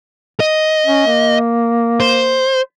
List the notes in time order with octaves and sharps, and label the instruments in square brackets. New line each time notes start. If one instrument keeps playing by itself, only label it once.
[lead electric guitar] D#5
[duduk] C#4
A#3
[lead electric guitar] C5